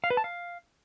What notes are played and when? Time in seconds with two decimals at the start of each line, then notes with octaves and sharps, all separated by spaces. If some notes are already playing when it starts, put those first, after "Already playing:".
0.04 F5
0.10 B4
0.17 A5
0.24 F5